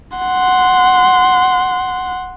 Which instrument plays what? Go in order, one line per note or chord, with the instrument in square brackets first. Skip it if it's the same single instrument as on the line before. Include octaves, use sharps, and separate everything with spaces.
[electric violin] F#5 C6